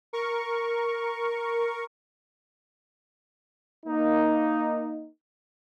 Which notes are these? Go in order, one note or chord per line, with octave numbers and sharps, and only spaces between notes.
A#4 C#6
A#3 D#4